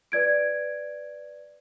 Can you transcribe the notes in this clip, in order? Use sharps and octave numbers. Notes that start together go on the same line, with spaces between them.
B4 D5 G#6 D7